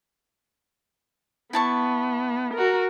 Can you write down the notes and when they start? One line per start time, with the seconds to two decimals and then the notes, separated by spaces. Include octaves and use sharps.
1.53 B3 E4 A5 C#6
2.54 F#4 A#4